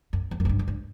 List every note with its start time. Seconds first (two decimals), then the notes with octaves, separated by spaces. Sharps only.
0.13 F#2
0.31 E2
0.40 F#2
0.45 A#2
0.49 G2
0.59 F#2
0.68 G2